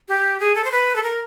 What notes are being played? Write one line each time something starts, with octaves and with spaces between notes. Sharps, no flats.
G4
G#4
A4
C5
B4
A4
A#4